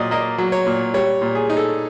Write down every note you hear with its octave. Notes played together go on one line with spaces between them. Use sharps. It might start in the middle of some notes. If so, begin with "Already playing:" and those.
Already playing: A#2 F#3 D5 D#5
A#3 D#5
F#3
C#5
A#2
G3 C#5
A#2
G#4
D#4
A4